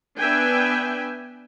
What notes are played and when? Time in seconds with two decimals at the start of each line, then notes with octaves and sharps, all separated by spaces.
0.17 B3 D4 B4 E5 G5 G#5